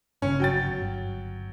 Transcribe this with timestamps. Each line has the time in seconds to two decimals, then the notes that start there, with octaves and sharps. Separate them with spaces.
0.22 G1 C#3 C#4
0.40 F#3 G5 A6
0.82 G1